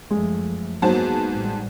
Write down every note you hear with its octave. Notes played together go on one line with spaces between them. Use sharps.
F#2 F3 G#3 A3
G#2 F#3 G#3 A#3 B3 C5 A5
A1 G3